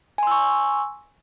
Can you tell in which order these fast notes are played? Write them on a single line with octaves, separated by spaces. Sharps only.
G#5 C6 E6 C#6